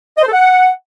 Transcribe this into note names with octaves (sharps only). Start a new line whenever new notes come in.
D#5
C5
A4
F#5